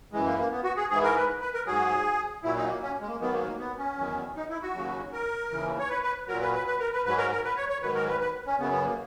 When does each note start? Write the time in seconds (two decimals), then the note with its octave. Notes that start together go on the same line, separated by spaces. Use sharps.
0.13 F#2 E3 G#3
0.26 A#3
0.39 A#3
0.52 B3
0.64 F#4
0.77 G#4
0.90 G#2 E3 G#4
1.03 A#4
1.16 B4
1.41 B4
1.54 A#4
1.66 G#2 F#3 G#4
2.43 A#2 F#3 E4
2.56 D#4
2.69 A#3
2.83 C#4
3.01 G#3
3.08 A#3
3.20 G#2 D#3 F#3 B3
3.34 A#3
3.47 A#3
3.59 B3
3.78 C#4
3.98 E2 D#3 F#3
4.36 D#4
4.49 E4
4.62 F#4
4.75 D#2 C#3 F#3
5.13 A#4
5.51 D#2 C#3 E3
5.79 C#5
5.89 B4
6.03 B4
6.28 A#2 F#3 A#4
6.41 B4
6.54 B4
6.67 B4
6.80 A#4
6.93 B4
7.05 G#2 F#3 B4
7.18 A#4
7.31 A#4
7.44 B4
7.57 C#5
7.69 C#5
7.82 G#2 D#3 F#3 B4
7.95 A#4
8.08 B4
8.20 B4
8.47 C#4
8.59 F#2 C#3 F#3 B3
8.71 B3
8.85 A#3